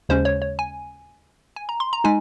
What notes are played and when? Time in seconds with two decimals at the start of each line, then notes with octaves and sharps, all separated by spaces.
0.09 D#2 C#3 G#3 C#4 C5
0.25 C#5
0.42 C#5
0.59 G#5
1.56 G#5
1.69 A#5
1.80 C6
1.93 A#5
2.04 G#3 D#4 G#5